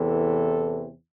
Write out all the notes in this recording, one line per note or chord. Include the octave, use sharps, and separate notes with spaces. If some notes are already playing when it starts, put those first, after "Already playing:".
Already playing: E2 C3 E3 A4